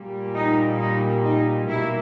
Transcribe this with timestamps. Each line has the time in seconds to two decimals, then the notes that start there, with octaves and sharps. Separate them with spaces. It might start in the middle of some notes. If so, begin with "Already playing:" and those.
Already playing: A#2 G3 A#3
0.35 D#4
0.79 D#4
1.24 D#4
1.68 B2 G3 A#3 E4